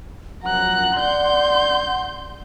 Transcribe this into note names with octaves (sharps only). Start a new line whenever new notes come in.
F#2 F3 F#5 A#5 F#6
D5 C6 G6